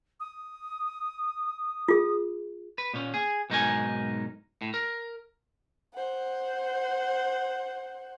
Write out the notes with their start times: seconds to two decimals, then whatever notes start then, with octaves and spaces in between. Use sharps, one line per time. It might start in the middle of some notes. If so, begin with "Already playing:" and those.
0.20 D#6
1.88 F4 G#4
2.78 B4
2.94 A#2 C#4
3.14 G#4
3.50 B1 G#2 D#4 F#4 A#4 G#5
4.62 A2
4.74 A#4
5.94 C5 F#5